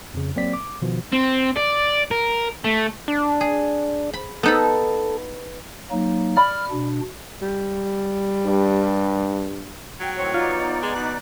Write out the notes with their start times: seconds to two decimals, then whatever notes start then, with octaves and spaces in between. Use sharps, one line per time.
0.14 F2 C#3
0.36 F#3 A#3 C4 D5 B6
0.53 D6
0.82 B2 D#3 F3
1.13 C4
1.56 D5
2.11 A#4
2.65 A3
3.08 D4
3.41 G#4
4.13 B5
4.43 B3 D#4 A4 B5
5.91 F#3 A#3 D#4
6.36 D5 B5 F6
6.71 B2 D4
7.42 G3
8.46 G2
10.00 F#3 G5
10.17 A2 D#3 C4 C#5
10.34 B3 D#4 F4 D5
10.83 G#3 G#5
10.95 B2 F#6